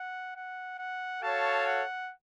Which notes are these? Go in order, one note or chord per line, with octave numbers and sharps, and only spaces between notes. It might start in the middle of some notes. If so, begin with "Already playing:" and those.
Already playing: F#5
F#5
F#5
F#4 A4 C#5 F5 A5
F#5